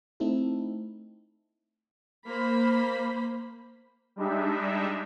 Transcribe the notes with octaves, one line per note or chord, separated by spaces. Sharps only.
A3 C4 D#4 E4 A4
A#3 C5 B5
G3 G#3 D4 D#4 E5